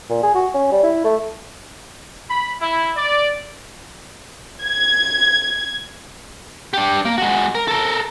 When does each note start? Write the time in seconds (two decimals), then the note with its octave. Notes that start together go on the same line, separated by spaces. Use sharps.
0.10 A#2
0.23 G#4
0.35 F#4
0.54 C#4
0.72 G3
0.83 E4
1.04 A3
2.29 B5
2.60 E4
2.96 D5
4.64 G#6
6.73 D4 G4
7.05 A#3
7.18 G#3 F#4
7.55 A#4
7.68 A4 A#4